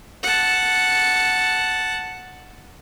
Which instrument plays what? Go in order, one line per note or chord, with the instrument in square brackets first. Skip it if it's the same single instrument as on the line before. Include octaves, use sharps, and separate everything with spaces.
[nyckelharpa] F#5 A5